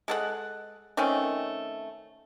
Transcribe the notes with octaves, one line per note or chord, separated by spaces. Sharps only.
G#3 A4 F#5
D#3 A3 C4 C#4